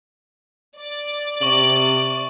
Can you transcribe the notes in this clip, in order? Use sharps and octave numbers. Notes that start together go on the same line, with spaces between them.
D5 D6
C3 C#6 F#7